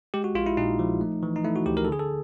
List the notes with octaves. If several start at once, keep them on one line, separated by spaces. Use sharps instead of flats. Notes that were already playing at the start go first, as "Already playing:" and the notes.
G#3 G4
F#4
A#1 F4
E4
A#2 D#4
F3
A3
E3
D#4
A3 E4
F#4
D2 G4
A#4
A4
D3 G#4
A4